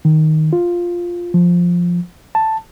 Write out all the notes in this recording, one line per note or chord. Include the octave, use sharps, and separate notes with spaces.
D#3
F4
F3
A5